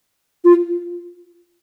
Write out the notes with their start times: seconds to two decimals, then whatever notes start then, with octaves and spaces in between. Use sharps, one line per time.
0.45 F4